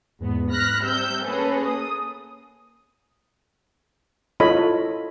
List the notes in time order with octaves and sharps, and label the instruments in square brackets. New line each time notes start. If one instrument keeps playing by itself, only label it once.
[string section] E2 G#2 B3
B5 F6 F#6 A#6
C3 G3 E6 G6
A#3 C#4 G#4 A4 B4
D#6
[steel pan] E4 F4 A4 C#5 D#5 B5